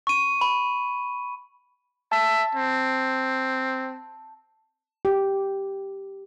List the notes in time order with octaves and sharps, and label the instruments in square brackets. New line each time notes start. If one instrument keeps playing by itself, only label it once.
[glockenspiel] C#6 D#7
B5
[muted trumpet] E5 [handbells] A5
[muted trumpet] C4
[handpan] G4